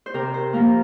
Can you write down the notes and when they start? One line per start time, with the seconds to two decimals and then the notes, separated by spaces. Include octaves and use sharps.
0.06 C5
0.14 C3 A#4
0.34 C5
0.53 F3 A#3 A#4